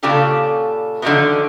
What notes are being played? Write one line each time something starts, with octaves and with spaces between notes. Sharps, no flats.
A#2 C#3 D4 F4 G4 A4
D3 D#3 F3 F#3 A3 B3